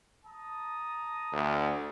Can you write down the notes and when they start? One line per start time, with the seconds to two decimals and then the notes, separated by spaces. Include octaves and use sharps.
0.25 A5 A#5 D#6
1.33 D2